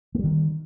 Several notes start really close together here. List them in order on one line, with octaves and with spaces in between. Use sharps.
A3 G3 D#3